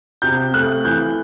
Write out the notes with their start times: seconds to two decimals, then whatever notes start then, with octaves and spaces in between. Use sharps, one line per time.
0.22 C3 G6
0.54 A3 F#6
0.85 E3 G6